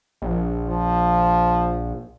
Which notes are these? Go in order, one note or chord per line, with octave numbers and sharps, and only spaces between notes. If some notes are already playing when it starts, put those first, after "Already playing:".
A#1
F3